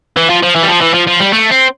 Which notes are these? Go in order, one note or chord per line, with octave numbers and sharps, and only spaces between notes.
E3
F3
F3
E3
G3
F3
E3
F3
F3
G3
A3
C4